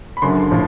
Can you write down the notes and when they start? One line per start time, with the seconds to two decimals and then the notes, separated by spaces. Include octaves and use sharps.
0.17 B5
0.22 F#1 F#2 D3 C6
0.51 A2 F3